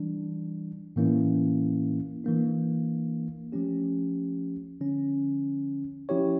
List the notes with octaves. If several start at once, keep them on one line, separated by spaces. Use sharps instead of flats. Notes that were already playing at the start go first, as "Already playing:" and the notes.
Already playing: E3 G3 D4
A2 E3 A#3 C#4 E4
E3 A#3 D4
F3 A3 C#4 G4
D3 F3 C#4
F3 C#4 E4 G4 C#5